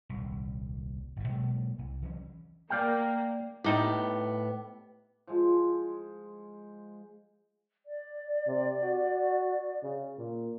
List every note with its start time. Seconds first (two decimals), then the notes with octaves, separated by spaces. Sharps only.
0.09 D#1 C2
1.16 G#1 A2
1.28 B2 F#3 G#3 A#3
1.78 C2
2.02 E3 F#3 C#4
2.70 A#3 D5 F5 G5
3.64 A2 G3 B3 D#4 G4
5.27 F3 G#3
7.86 D5
8.47 C3
8.83 F#4
9.83 C#3
10.18 A#2